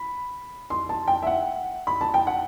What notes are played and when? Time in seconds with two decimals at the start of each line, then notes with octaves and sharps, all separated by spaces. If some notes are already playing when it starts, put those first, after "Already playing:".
Already playing: B5
0.70 C6
0.89 A5
1.08 G5
1.22 E5
1.27 F#5
1.87 B5
2.01 A5
2.14 G5
2.27 F#5